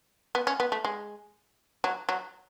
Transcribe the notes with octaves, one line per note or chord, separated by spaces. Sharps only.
B3
C#4
B3
A3
G#3
F#3
F#3